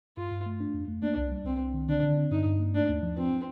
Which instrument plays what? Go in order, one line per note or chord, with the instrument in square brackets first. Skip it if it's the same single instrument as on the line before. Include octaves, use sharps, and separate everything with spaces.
[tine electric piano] G2 [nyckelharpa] F4
[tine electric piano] G2
A3
D4
F2
A3
[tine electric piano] A#3 [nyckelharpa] D4
[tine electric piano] C2
G3
[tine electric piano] C2 [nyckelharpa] C4
[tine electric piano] C2
D#3
[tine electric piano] D3 [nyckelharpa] D4
[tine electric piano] D3
C4
[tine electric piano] G2 [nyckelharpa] D#4
[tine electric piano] G2
A#3
[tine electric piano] A3 [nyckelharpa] D4
[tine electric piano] D#2
F3
[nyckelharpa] C4 [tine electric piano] F4